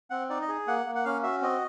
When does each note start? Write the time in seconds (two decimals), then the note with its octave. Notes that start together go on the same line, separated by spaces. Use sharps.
0.10 C4 F#5
0.30 D#4 D5
0.42 D#5
0.49 G#4
0.67 A#3 F#5
0.86 A#3
0.95 F#5
1.05 C#4 F5
1.23 F#4 E5
1.42 C4 D#5